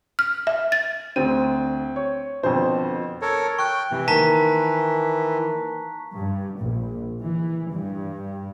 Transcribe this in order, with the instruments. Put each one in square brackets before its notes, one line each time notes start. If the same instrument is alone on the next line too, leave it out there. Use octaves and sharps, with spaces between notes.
[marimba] F6
E5
A6
[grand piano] D2 D#7 [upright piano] C4
[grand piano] C#5
[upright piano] F2 C5 [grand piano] B2 D3
[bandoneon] A4 A#4 C#5
[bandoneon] G5 [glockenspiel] C#6 F#6
[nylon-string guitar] C3 [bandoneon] E3
[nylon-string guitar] D#3 A#3 [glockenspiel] A5 A#5 B6
[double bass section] G2
A#1
E3
G2